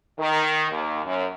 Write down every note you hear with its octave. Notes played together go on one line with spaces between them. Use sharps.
D#3
D#2
F#2